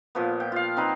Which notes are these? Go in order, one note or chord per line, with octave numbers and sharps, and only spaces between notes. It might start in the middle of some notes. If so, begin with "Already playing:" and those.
A#2 F3 B3
G5
F4 F5
C4 D#4 B4